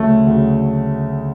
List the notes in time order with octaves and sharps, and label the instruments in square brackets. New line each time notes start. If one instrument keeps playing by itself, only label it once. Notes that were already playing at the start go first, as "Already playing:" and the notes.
Already playing: [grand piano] D2 C#3 F#3 [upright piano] A3
[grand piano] D2 C#3 F#3